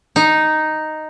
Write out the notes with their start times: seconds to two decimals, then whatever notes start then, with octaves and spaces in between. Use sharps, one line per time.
0.16 D#4